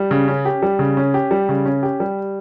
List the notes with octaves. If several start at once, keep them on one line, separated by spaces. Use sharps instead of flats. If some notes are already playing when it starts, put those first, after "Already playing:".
Already playing: G3
C#3
C#4
G4
G3
C#3
C#4
G4
G3
C#3
C#4
G4
G3